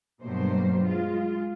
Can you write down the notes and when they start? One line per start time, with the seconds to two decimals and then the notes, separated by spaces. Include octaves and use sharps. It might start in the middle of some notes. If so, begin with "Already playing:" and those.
0.23 G2 B2 F#3 A3 A#3 C5
0.81 G#3 F4